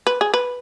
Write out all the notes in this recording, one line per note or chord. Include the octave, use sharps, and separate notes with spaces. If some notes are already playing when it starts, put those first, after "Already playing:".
B4
G#4
B4